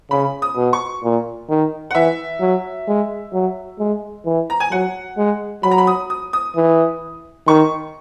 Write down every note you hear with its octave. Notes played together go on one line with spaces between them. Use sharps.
C#3 B5
D#6
B2
C#6
A#2
D#3
F#5
E3 E5
F#3
G#3
F#3
G#3
E3
A#5
G#5
F#3 F#5
G#3
F#3 B5
A#5
B5
D#6
D#6
D#6
E3
D#3 C#6